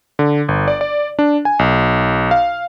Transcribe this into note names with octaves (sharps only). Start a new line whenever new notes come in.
D3
G1
D5
D5
D4
G#5
B1
F5